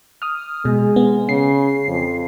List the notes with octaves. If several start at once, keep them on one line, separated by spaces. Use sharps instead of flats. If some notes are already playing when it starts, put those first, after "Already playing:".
D#6 F6
B2 G#3
B3
C#3 C7
F2